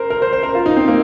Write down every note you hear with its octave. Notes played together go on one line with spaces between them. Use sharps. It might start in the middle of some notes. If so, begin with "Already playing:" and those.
Already playing: A#4 C5
A#4
C5
C5
A#4
F4
D#4
C4
A#3